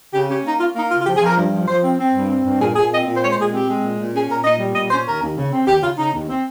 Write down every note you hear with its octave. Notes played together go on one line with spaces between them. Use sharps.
C#3 G4
C#4 G4
A#3 D#4
C#4 F4
A#3 D#4
C#3 F4
F4
F3 G4
G#4
F3
A#4
G2
F3
F3 C5
C4
C4
G2
C4
G2
A#2 G#4
A#2 G#4
C4 D#5
A#2
C5
G#3 C#5
C5
A#2 G#4
C4 G4
G#3
A#2
A#2
C#4 G#4
A#2 A#4
A#2 D#5
G3
A#2 D#5
C#4 C5
D#2 A#4
D#2
C#3
C4
D#2 G4
C#3 F4
C#3 D#4
D#2
C4